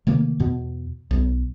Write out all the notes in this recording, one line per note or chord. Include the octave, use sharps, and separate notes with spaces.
C3 D#3 A3 A#3
E2 B2
B1